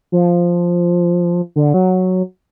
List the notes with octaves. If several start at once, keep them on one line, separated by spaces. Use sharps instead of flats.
F3
D3
F#3